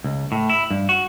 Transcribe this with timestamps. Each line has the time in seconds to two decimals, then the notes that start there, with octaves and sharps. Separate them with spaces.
0.04 C#2
0.32 A2
0.50 E4
0.71 G2
0.89 F#4